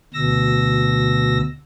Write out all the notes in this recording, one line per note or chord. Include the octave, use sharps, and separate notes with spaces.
D2 B2 E6 A#6